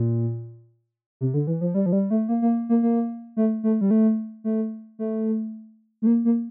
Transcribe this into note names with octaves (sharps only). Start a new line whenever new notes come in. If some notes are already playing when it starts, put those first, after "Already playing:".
Already playing: A#2
C3
D3
E3
F3
G3
F3
G3
A3
A#3
A#3
A#3
A#3
A3
A3
G3
A3
A3
A3
A3
A#3
A#3